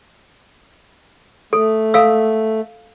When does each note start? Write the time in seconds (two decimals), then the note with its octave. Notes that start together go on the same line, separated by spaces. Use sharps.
1.53 A3 A4
1.94 A4 F5 E6